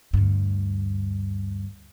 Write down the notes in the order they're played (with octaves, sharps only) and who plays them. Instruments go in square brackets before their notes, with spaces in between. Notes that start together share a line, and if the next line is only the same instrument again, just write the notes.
[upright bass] D2 G2